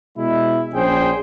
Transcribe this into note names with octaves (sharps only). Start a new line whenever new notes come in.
B2 G#3 E4
A#1 C#4 G#4 C5 G5